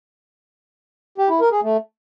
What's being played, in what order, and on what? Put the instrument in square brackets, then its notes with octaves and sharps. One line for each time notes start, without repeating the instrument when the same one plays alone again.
[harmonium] G4
E4
A#4
G#4
A3